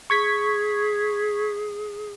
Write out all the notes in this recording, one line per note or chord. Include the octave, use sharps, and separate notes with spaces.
G#4 C#6 G#6 B6